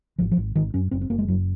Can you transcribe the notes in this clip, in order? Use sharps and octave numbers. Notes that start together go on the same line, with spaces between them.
G#1 F3
F3
G#1
G#1 D#3
F#2 C#4
F#1 C4
C4
F#1 A#3
G#3
F#2 F#3